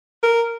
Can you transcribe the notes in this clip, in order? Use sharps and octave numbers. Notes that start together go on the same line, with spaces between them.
A#4